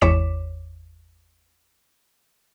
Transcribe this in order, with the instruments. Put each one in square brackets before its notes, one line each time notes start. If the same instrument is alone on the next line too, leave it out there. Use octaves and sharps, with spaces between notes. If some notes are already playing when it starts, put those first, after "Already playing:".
[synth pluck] G#1 E2 C#5 D6 B6 E7